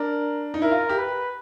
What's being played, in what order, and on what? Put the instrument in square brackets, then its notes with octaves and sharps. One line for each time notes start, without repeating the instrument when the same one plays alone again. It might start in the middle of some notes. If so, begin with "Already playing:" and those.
Already playing: [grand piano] D4 [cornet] A#4
[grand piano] D#4
[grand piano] E4 [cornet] A#4
[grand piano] F4
G4
[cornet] B4